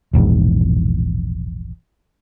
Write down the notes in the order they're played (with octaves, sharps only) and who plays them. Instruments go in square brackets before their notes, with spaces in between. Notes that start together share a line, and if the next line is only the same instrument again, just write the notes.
[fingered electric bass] E1 A#1 E2 G#2